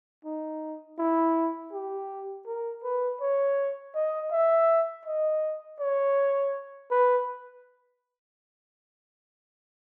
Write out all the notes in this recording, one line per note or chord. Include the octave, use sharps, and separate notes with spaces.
D#4
E4
G4
A#4
B4
C#5
D#5
E5
D#5
C#5
B4